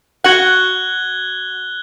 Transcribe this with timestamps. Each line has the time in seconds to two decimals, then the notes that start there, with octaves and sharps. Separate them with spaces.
0.24 F#4 F#5 F#6 G#6 G7